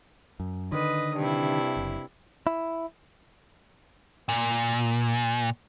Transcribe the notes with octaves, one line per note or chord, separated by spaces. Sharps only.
F#2
D3 D#3 B4 D#5 D#6
G2 C3 E4
F#1
E4
A#2